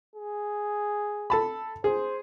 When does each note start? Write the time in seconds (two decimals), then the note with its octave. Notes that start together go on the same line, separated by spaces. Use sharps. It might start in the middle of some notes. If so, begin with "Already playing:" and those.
0.16 G#4
1.30 A4 A5 B5
1.84 G#4 C5